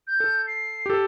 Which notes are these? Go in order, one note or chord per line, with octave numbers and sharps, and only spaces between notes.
G6
A4
C7
G4 A4